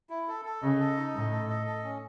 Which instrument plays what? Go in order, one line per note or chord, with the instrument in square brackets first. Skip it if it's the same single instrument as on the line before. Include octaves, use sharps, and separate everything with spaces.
[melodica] E4
A4
A4
[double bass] C#3 [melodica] D#5
[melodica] A4
D#4
[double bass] A2 [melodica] D#5
[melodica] A4
D#5
A4
C#4